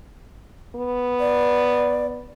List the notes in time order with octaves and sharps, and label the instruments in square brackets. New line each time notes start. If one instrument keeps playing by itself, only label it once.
[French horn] B3
[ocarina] D5